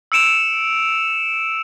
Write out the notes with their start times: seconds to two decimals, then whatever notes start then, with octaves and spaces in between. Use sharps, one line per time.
0.12 E6 C#7 D7 E7 F7